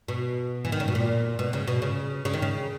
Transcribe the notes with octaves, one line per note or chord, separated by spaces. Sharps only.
B2
E3
D#3
C#3
B2
A#2
B2
C#3
B2
C#3
C#3
D#3
C#3